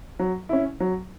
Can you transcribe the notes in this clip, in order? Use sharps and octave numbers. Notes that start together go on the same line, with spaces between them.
F#3
C#4 E4
F#3